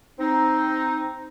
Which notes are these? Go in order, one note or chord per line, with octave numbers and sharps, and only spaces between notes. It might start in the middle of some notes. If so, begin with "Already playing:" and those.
C4 D#4